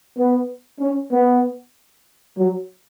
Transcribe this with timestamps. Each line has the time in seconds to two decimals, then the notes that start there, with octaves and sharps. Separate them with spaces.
0.17 B3
0.80 C#4
1.11 B3
2.37 F#3